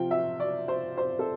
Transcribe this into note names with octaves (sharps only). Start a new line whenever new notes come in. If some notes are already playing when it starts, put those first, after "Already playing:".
Already playing: C3 F3 C4 F4 G5
E5
D5
C5
C5
A4